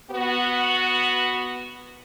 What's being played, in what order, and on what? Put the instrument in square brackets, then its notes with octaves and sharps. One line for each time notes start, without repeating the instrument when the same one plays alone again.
[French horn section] B3 F#4